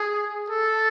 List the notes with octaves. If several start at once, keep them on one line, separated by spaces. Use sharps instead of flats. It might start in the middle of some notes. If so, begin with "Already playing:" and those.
Already playing: G#4
A4